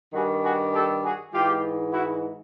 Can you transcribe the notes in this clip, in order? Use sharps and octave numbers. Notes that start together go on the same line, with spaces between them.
G2 D#3 G3 F#4 G#4
F#4 G#4
G4 A4
F#4 G#4
G#2 E3 G#3 F4 G4
E4 F#4